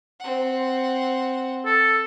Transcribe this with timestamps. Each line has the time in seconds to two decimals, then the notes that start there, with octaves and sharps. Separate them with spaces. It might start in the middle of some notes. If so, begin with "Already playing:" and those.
0.20 C4 F#5
1.66 A4